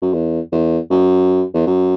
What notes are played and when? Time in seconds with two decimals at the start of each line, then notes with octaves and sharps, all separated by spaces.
0.02 F#2
0.14 E2
0.52 E2
0.91 F#2
1.54 E2
1.67 F#2